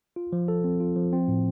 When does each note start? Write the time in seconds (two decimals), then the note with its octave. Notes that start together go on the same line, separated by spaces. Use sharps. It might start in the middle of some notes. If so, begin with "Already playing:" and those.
0.16 F4
0.33 F3
0.48 A4
0.64 C4
0.80 F4
0.96 F3
1.13 C4
1.28 A2